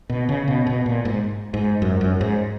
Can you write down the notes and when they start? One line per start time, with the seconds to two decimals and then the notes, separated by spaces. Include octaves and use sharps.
0.09 B2
0.29 C#3
0.48 B2
0.67 B2
0.86 A#2
1.05 G#2
1.54 G#2
1.82 F#2
2.01 F#2
2.21 G#2